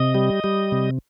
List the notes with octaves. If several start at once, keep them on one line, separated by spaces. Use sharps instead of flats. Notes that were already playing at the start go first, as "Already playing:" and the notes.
Already playing: C3 D#5
G3
G3
C3